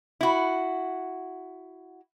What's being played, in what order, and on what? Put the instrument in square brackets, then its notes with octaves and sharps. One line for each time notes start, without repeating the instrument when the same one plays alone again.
[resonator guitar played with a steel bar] E4 F#4